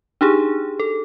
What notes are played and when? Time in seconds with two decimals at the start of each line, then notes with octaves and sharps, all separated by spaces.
0.21 D4 D#4 G4 G#4
0.80 A4